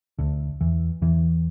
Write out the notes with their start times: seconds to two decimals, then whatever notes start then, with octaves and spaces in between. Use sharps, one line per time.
0.19 D2 D3
0.61 E2 E3
1.02 E2 E3